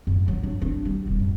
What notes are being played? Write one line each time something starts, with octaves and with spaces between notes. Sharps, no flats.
F#2
F#3
D4
D4
G3
E1
F#2